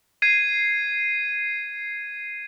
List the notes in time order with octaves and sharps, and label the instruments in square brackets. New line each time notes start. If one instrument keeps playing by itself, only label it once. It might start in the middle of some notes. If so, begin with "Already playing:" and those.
[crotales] G#6 C7 D#7